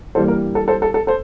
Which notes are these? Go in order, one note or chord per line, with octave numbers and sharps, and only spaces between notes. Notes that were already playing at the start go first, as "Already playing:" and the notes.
G2 E3 G3 A#3 A4 C5
A#4
A4
A4 C5
A4
A4
A4 C5